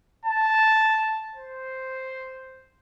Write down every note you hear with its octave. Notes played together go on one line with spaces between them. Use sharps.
A5
C5